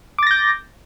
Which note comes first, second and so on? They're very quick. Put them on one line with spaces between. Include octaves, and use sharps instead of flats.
D6 A6 A#6 G6